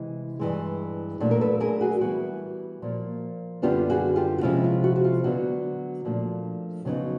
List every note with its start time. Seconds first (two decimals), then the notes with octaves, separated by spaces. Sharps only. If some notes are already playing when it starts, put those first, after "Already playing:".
Already playing: C3 E3 G#3 E4
0.39 G2 E3 G#3
1.20 A#2 F#3 A3 D4
1.31 A#4
1.41 A4 B4
1.60 G#4 A#4
1.81 F#4 G#4
2.01 E3 G3 B3 E4 F#4
2.82 A#2 F3 A#3
3.62 F#2 D3 G3 B3 D4 F4 G4
3.90 F#4 G#4
4.16 F4 G4
4.38 F#4
4.43 C3 F3 G#3 C#4 E4 F4
4.64 F4
4.84 F#4
4.96 F#4
5.04 F4
5.24 D3 F#3 B3 F#4
6.05 A#2 F3 A3 D4
6.85 F2 C#3 F#3 B3 D#4